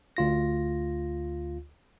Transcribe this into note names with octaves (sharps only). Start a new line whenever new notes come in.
D2 F4 A#6